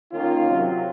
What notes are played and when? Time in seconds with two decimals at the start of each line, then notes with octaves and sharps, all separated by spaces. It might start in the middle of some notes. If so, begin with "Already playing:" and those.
0.12 D#3 A#3 C#4 F4
0.48 C3 F#3 C4